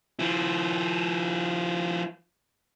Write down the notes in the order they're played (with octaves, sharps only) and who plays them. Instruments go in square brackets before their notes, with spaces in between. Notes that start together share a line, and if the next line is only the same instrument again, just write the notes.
[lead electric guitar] F3 E4